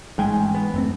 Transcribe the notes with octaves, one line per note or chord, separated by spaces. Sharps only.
A1 G#2 G#3 G5 G#5
B3
F#2 A3 C4